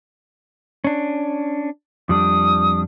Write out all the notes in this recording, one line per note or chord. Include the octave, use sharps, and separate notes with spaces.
C#4 D4
F2 G3 D4 D#6